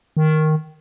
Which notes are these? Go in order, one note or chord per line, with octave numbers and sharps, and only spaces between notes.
D#3